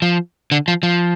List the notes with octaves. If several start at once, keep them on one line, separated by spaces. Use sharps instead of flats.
F3
D3
F3
F3